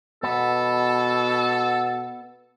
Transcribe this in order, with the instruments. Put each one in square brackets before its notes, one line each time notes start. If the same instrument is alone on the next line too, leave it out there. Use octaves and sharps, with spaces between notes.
[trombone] B2 [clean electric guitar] B3 [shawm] A4